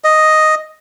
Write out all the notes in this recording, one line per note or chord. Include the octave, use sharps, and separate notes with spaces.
D#5